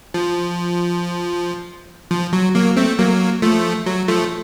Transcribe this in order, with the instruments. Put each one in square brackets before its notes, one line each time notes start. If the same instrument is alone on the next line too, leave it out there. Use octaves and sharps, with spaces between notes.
[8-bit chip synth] F3
F3
F#3
F#3 A#3
A3 C4
F#3 A#3
F3 A3
F#3
F3 A3